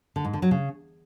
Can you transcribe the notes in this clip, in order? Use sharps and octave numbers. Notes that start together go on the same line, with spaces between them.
D3
G#2
D3
F#3
C#3